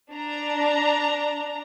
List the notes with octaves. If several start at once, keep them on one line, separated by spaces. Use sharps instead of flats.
D4 A#5